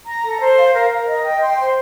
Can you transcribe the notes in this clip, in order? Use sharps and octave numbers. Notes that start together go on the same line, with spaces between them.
A#5
A4
C5
F5
A#4
A#4
D#5
G5
C6
C5